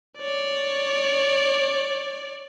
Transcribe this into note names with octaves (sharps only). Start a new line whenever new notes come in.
C#5 D5